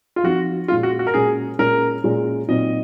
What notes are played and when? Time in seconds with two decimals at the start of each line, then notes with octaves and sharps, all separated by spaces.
0.16 F4
0.23 F3 C4 D#4 F#4
0.68 A#2 G#3 C#4 F4
0.83 F#4
0.99 F#4
1.07 A#4
1.14 A#2 G#3 C#4 G#4
1.59 A#2 G#3 C#4 A#4
2.04 A#2 G#3 C#4
2.48 A#2 F#3 C4 D#4 D#5